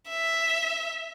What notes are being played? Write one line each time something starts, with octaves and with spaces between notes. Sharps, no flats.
E5